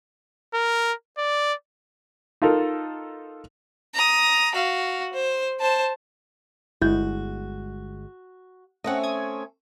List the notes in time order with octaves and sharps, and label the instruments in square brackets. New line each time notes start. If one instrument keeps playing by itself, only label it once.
[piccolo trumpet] A#4
D5
[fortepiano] D#4 F4 A4 A#4
[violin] A#5 D#6
F#4 F5
C5
C5 A5
[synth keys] G1 G#3 [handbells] E4 G6 [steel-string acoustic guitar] F#4
[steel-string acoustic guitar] A3 C4 C#4 [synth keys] D#5 F#5
[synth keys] D#6 G#6